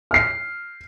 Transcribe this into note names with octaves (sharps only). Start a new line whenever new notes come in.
F6 C7